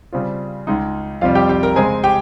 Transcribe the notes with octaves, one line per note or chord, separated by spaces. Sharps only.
C#3 G3 C4 F4
C#2 C#3 G#3 D#4
F2 C3 G3 F4 F5
G4 G5
G4 G5
A#4 A#5
C#3 G#3 C4 G#4 G#5
G4 G5